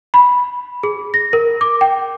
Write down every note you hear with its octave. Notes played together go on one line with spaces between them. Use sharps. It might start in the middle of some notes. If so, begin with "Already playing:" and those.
B5
G#4
A#6
A#4
D6
G5